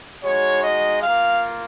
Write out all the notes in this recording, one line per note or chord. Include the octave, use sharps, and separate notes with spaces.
G#3 D#4 F#4 C#5
D#5
A#3 F4 F5